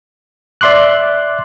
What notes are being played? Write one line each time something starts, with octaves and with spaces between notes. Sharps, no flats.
D5 E5 C6 D6 F#6